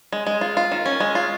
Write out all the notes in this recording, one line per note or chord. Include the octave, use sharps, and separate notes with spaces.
G#3
G#3
F4
F4
D#3
C#4
G#3
F4